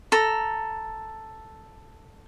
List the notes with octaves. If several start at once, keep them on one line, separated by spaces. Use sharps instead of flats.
A4 A#5